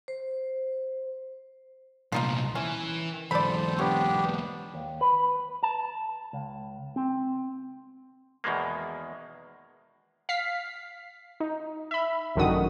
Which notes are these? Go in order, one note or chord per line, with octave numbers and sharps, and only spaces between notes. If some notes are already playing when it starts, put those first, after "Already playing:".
C5
C2 A#2 F3 D#4 F4
E3 C#4
E2 G#2 A4 C5 D5 B5
B3 D4 G4 C#5
D#2
B4
A5
C#2
C4
E2 B2 D#3 G#3 A#3
F5 B6 C7
D#4
E5 B5
A1 F#2 D3 D#3 F#4 D#6